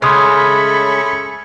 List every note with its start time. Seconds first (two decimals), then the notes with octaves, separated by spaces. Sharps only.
0.02 C#3 G#3 A3 C#4 B5 C6 D#6 F6